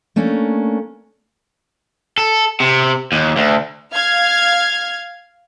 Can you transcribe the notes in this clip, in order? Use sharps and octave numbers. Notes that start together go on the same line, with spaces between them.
A3 A#3 C#4 D4
A4
C3
D#2
D2
F5 F6 G#6